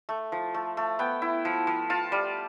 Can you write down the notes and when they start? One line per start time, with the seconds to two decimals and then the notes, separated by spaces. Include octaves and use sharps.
0.09 A3
0.32 F3
0.54 A3
0.77 A3
0.99 B3 G5
1.22 E4
1.45 F3
1.67 F3
1.90 F4 A5
2.12 G3